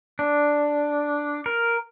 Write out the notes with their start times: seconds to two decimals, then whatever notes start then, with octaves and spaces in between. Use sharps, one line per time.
0.19 D4
1.46 A#4